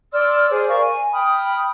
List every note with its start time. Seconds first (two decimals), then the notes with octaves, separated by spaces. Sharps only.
0.13 D5 C6 E6 F6
0.50 G#4 C5 D5
0.69 A#4 F5 C#6
0.81 G#5
1.13 G5 B5 D#6 F6